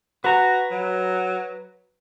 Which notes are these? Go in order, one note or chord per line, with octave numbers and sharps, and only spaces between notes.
F#4 B4 A#5
F#3